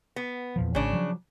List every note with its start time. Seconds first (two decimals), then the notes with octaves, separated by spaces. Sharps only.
0.16 B3
0.56 E2 A#2 F3
0.75 G#1 C#3 D4
0.93 F3 F#3